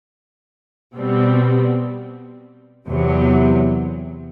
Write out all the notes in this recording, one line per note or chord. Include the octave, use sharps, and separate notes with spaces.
B2 G3 C4
E2 C3 F#3